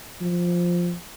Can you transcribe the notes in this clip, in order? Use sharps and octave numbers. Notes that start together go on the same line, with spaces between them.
F3